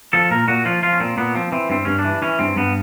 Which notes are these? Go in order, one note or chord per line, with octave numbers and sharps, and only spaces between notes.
F3 A4
A#2 A#4
A#2 F#4
F3 F4
F3 F4
C#4
A#2 C4
A#2 B3
F3 C4
E3 C4
G2 C4
G2 C#4
D4
E3
E3 C#4
G2 C4
G2 B3